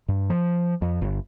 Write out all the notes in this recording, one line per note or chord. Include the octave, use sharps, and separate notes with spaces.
G2
F3
F2
G1